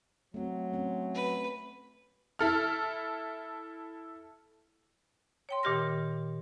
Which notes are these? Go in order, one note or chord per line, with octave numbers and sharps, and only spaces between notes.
F#3 A3 C4
A3 C4 C#4
B4
E4 A4 F6
C#5 G5 C6
A#2 D#3 G4 F6 A#6